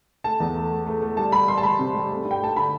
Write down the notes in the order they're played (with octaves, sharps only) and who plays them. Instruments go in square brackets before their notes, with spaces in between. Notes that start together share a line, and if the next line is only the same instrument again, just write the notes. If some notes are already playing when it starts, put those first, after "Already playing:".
[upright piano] A3 A5
E2
A3
A3
A3
A3
G3 A5
G3 B5
G3 C6
A5
G3 B5
C3
G3
A3
G2
G5
A3 A5
D3 B5